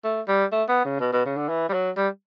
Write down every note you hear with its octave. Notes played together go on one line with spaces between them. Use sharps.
A3
G3
A3
B3
C#3
B2
B2
C#3
D3
E3
G3
F#3
G3